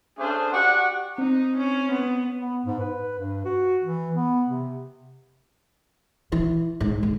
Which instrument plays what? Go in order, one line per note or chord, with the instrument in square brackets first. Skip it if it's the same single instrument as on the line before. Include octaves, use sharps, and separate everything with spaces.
[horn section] A3 C#4 D4 G#4 C5 F5
F#4 G4 D5 F#5
[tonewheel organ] C4 [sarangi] D#4
[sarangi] C#4
B3
[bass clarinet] B3
G#2
B4
G2
F#4
E3
B3
C3
[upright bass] E3
G#2
D3